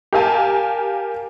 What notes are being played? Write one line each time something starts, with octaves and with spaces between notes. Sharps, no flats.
G4 A#4 F5 G#5 A5